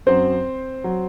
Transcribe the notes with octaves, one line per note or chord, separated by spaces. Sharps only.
F#2 F#3 C4 C5
F#3